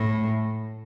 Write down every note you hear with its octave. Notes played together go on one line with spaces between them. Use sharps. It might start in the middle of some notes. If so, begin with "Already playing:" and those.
Already playing: A2